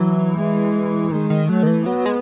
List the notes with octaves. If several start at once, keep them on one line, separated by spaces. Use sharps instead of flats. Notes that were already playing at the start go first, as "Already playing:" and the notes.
Already playing: E3 F#3
G#3
D#3 G#3
D#3
F#3 A3
D#3
E3
F#3 B3
G#3